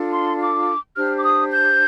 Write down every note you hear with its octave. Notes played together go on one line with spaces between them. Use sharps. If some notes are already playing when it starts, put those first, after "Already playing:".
Already playing: D4 F4 A4
C6
D6
D4 G4 C5 F6
D6
D#6
G6